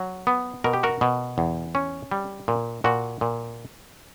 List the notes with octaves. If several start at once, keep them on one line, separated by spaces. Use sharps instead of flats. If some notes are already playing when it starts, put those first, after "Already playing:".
Already playing: F#3
B3
B2 A#4
G4
F#4 A#4
B2
E2
C#4
G3
A#2
A#2 F#4
A#2